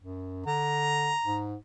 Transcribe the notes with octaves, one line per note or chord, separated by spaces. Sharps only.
F#2
D3 A#5
G#2